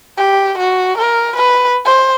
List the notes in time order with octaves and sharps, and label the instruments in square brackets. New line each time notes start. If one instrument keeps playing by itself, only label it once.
[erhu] G4
F#4
A#4
B4
C5